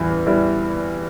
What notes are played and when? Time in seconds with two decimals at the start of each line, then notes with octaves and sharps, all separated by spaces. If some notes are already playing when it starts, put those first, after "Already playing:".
Already playing: E2 E3 G3 E4
0.27 G3 E4